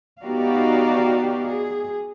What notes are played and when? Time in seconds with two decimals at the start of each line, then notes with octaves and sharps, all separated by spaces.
0.24 B3 D#4 F#4 G4 D5 F5
1.50 G#4